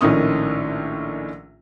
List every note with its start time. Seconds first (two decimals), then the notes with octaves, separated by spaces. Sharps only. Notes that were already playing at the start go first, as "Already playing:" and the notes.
0.01 A#1 A2 D#3 C#4 D#6